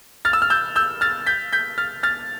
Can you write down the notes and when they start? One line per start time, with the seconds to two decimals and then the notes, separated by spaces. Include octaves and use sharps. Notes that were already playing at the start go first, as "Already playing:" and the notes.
0.25 F6 A6
0.33 E6
0.42 F6
0.50 E6 G6
0.76 E6 G6
1.01 F6 A6
1.26 G6 B6
1.53 G6 B6
1.78 F6 A6
2.03 F6 A6